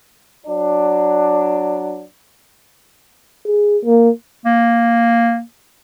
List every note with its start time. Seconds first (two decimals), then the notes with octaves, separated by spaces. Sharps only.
0.46 F#3 D4
3.45 G#4
3.85 A#3
4.45 A#3